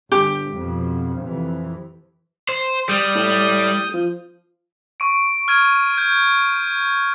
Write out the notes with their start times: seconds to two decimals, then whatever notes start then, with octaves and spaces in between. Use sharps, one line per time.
0.12 G1 G4
0.52 F2 B2
1.20 F2 C3 E3
2.49 C5
2.89 G3 D#6 G6
3.15 A2
3.94 F3
5.00 C#6 D7
5.48 F6 G#6 D#7
5.98 G6